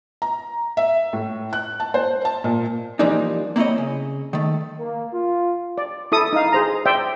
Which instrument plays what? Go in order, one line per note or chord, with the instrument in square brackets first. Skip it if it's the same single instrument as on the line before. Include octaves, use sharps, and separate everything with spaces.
[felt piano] A#5
E5
A2
F#6
A5
C5
A5
A#2
[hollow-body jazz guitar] E3 F3 G3 A#3 D4 D#4
A#3 C4 E4 C5 C#5 D#5
C#3
D#3 A3
[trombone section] A#3
F4
[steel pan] D5
E4 A4 D#6
D#4 F5
G#4 C5 A#5
C5 D5 E5 G5